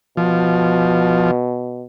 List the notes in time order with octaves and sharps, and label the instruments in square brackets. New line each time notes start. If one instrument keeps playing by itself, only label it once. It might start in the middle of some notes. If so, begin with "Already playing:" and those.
[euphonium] B2 [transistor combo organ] F3